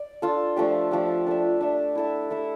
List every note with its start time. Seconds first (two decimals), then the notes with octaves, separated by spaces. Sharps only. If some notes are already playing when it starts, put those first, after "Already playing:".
Already playing: D5
0.22 D4 F4 A4
0.57 F3 A3 D4 G4
0.91 F3 A3 D4 G4
1.27 D4 A4 E5
1.61 D4 A4 E5
1.95 E4 A4 E5
2.30 E4 A4 E5